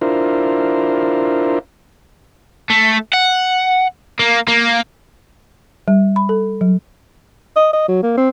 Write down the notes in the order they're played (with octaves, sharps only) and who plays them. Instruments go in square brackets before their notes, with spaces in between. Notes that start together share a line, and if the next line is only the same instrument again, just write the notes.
[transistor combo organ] D4 E4 F4 A#4 C5
[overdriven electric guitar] A3
F#5
A#3
A#3
[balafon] G3
B5
A4
F#3
[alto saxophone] D#5
D#5
F#3
A#3
C4